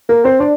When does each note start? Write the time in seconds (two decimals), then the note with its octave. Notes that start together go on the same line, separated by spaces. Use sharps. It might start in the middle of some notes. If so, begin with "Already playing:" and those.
0.09 A#3 A#4
0.25 C4 C5
0.40 D4 D5